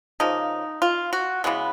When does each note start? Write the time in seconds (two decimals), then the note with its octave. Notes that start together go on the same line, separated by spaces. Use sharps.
0.20 C#3 F3 A#3 D#4
0.82 F4
1.13 F#4
1.44 C#3 E3 G#3 B3